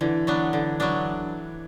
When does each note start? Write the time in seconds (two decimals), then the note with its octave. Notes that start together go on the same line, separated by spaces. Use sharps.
0.01 D3 E3
0.27 F#3 B3 D4
0.53 D3
0.80 F#3 B3 D4